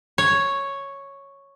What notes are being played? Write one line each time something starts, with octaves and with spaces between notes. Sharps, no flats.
C#5